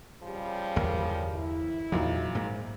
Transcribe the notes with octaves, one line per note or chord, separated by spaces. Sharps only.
C#3 F3 G3
G1 E2 A#3 A#4
E4
E2 A#2 F3 F#3 D#4
G#2 A#3